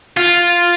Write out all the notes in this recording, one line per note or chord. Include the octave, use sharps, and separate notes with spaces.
F4